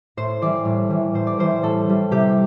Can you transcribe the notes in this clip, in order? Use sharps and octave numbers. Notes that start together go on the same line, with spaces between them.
A2 C5
E3 G3 D5
A2
E3 G3
A2 C5
D5
E3 G3 C5
A2 A4
E3 G3
C3 G4